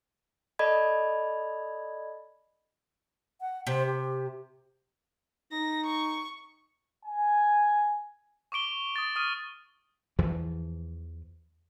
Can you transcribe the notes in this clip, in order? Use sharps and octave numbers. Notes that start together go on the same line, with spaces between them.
A4 D5 D#5 B5 G#6
F#5
C3 C5
G4
D#4 A#6
C#6
G#5
C#6 D6 D7 G7
D#6 A6
D#6 F6 D#7
E2 E3 F3